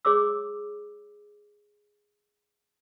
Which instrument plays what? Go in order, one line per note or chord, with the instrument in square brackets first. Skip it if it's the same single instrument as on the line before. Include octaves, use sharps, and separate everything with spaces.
[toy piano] G#4 C#5 D6 E6